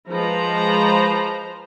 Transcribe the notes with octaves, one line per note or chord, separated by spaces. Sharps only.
F3 G#3 B4 C5 A#5